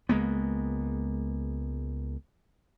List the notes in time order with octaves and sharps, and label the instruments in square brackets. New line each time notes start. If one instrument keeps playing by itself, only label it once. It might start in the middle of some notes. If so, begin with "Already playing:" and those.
[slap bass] C#2 G#3 A#3 B3